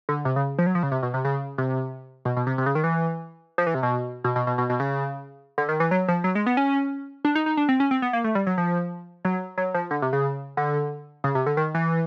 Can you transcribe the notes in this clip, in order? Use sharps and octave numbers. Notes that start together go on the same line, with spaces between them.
D3
C3
C#3
F3
F#3
F3
C#3
C3
B2
C3
C#3
C3
B2
B2
C3
C3
C#3
D#3
E3
F3
E3
C3
B2
B2
B2
B2
B2
B2
C#3
D3
D#3
E3
F#3
F3
F#3
G#3
B3
C#4
D4
D#4
D#4
D4
C4
C#4
C4
B3
A#3
A3
G3
F#3
F3
F#3
F#3
F3
D3
C3
C#3
D3
C#3
C3
D3
D#3
E3